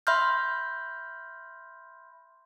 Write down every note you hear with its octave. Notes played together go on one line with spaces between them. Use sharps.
E5 B5 C6 F6 G6